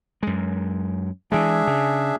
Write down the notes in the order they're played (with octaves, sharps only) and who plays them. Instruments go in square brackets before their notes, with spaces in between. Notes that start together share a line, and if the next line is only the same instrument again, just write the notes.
[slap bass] F#2 G#3
[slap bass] E3 G#3 [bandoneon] D4 G#4 E5
[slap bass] C#3